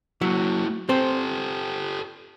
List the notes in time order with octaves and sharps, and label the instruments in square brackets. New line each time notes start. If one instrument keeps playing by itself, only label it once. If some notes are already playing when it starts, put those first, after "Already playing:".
[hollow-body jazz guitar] F#3 [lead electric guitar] A#3 E4
[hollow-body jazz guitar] C4 C5 [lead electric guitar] G4 A4